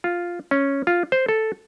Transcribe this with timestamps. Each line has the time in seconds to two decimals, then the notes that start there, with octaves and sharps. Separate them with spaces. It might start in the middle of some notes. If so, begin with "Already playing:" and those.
0.04 F4
0.51 C#4
0.87 F4
1.12 C5
1.29 A4